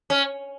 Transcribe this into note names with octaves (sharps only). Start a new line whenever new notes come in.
C#4